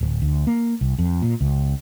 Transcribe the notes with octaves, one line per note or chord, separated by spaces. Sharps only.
D1
D2
A#3
C2
F2
A#2
C#2